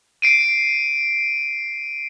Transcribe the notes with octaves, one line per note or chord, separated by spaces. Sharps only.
C7 D7 D#7